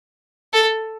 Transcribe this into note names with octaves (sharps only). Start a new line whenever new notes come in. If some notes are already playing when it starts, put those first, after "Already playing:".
A4